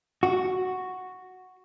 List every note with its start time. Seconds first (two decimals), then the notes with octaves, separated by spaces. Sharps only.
0.23 F#4